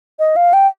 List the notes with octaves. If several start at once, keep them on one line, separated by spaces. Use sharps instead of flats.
D#5
F5
G5